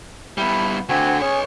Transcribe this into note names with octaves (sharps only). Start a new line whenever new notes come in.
G3 B3 E4
D2 D3 C4 F#4 G#5
C#4 G#4 B4 C#5